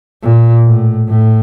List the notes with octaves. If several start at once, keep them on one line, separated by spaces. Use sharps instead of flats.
A#2
A2
A2